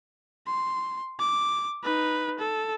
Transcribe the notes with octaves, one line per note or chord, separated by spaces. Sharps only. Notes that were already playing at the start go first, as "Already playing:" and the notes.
C6
D6
D#4 B4
A4